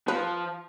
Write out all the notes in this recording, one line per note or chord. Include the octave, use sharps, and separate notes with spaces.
F3 B4